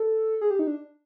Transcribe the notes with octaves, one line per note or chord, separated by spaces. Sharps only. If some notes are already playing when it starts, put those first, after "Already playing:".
Already playing: A4
G#4
G4
D#4
D4